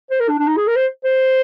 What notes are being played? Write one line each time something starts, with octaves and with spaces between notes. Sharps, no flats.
C5
A#4
D4
D4
D#4
G#4
A#4
C5
C5